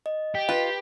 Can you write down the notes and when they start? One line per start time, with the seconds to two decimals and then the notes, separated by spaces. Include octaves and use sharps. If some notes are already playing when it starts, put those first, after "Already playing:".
0.06 D#5
0.35 G4
0.49 F4 B4